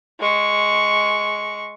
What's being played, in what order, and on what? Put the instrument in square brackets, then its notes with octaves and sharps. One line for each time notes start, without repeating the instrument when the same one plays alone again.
[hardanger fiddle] G#3 C#6